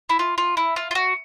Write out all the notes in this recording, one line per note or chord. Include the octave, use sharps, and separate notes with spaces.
E4
F4
F4
E4
F4
F4
F#4